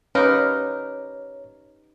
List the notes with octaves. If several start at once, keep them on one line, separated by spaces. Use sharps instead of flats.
C#4 D#4 G4 A#4 B4 C#5 F5